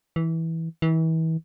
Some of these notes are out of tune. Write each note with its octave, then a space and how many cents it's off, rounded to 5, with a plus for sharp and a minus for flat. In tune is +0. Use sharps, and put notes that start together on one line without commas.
E3 -15
E3 -35